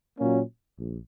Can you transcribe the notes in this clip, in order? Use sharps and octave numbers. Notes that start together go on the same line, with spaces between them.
A#2 F#3 A#3 C#4
A#1